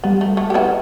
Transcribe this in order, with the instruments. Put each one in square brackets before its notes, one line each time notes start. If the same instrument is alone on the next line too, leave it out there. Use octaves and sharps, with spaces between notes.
[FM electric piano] G3 [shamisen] B3
[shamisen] A3
A3
G4
B3 E4